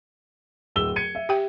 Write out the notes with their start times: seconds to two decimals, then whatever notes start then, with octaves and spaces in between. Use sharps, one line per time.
0.76 D1 E6 G7
0.96 G#6 C#7 D#7
1.15 E5
1.29 G4 G5